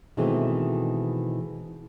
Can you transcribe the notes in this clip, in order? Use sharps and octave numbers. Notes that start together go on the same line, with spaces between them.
B2 D#3 E3 G#3 A3 C4